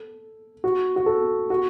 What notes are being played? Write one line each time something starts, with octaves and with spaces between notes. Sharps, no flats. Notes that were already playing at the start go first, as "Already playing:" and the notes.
Already playing: A4
F#4
F#4
A4
F#4